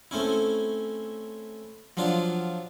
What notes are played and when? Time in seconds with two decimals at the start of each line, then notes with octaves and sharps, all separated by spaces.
0.11 A3 C4 C#4 E4
1.97 F3 F#3 D4 F4